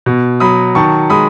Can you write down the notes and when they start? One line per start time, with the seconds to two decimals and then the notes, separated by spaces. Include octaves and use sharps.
0.06 B2
0.40 F#3 B5 D#6
0.75 D#3 A5 C#6
1.10 G#3 B5 D#6